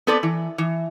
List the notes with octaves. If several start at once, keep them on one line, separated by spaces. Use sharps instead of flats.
B3 C4 A4 B4 D5
E3
E3